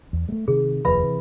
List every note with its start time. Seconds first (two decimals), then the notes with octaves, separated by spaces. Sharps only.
0.13 E2
0.29 G#3 A3
0.48 C3 D#3 G#4
0.85 F1 D#2 F3 B4 E5 B5
1.03 C3 E3